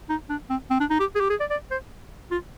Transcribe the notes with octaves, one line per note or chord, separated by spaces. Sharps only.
D#4
D4
C4
C4
D4
D#4
G4
G#4
G4
G#4
D5
D5
C5
F4